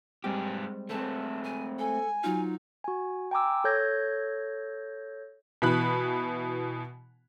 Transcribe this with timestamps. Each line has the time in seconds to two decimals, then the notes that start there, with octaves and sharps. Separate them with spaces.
0.24 G#2 G3 G#3 C4 G4
0.90 A3 C4 G#4 B4 A5
1.44 G#5
1.79 A4 G#5
2.23 F#3 D#4 F4
2.84 F#4 G#5
3.31 G5 G#5 A#5 C6 D6 E6
3.64 A4 C#5 G6 G#6 A#6
5.62 B2 E3 B5 F#6